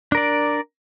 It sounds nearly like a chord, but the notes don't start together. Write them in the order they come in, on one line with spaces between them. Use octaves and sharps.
D4 A#4 D5